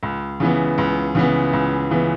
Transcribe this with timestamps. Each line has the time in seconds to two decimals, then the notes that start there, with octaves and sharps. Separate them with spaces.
0.03 C#2
0.40 C#3 E3 B3
0.78 C#2
1.15 C#3 E3 B3
1.53 C#2
1.91 C#3 E3 B3